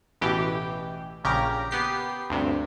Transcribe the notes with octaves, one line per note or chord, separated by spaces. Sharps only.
A1 B2 E3 G4
A#1 C#3 G4 A#4 A#5
B3 G4 C7
D2 G2 C3